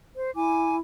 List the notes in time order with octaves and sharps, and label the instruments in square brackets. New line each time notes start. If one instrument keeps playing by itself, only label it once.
[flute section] C5
[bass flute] E4 [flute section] G#5 D6